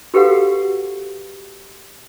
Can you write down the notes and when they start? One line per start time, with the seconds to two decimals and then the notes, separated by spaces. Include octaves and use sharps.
0.14 F#4 G4 A4 B4 F5 F#5